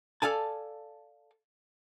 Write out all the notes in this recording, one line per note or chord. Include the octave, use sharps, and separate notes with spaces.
A4 D5 F5 G#5 A5